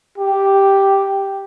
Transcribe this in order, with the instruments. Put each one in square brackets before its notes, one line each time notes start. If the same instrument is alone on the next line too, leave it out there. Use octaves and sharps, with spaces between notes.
[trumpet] G4